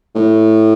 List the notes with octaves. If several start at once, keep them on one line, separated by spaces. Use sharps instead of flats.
A2